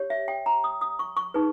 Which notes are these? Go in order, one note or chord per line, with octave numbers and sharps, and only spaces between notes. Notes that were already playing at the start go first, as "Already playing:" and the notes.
Already playing: G4 C#5
E5
G5
A#5
D#6
D#6
C#6
C#6
D#4 G#4 B4